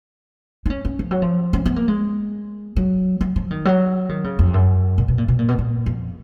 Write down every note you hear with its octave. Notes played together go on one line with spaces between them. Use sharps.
D#4
C#4
C#4
F3
F#3
F3
C#4
B3
A#3
G#3
F#3
F#3
F3
D#3
F#3
D#3
C#3
F2
F#2
A#2
B2
A#2
B2
A#2
B2
A#2
F2